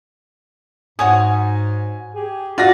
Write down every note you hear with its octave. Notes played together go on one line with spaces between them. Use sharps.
G#2 F#4 C#5 G#5 D#6
G4 G#4
F4 F#4 D5 A#6